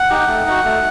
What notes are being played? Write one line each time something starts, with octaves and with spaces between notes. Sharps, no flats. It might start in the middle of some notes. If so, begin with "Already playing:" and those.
Already playing: F#5
D#4 G4
A3
D#4 F#4
A3